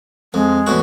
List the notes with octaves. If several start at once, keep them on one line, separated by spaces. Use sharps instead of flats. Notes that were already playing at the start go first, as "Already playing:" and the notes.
F2 G#3
E2 A2 F#4